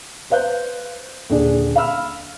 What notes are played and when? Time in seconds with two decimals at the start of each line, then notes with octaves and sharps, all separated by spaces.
0.30 B4 C5 F5 F#6 G6
1.30 D#1 D3 D4 G#4 D5
1.76 F5 B5 E6 F6